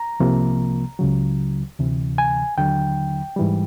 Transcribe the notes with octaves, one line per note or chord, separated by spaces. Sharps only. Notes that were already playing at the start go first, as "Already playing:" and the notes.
Already playing: A#5
C2 C3 F3 A#3
C#2 C#3 F#3
D2 C3 E3
G#5
D#2 D3 F#3 G5
G#2 E3 G3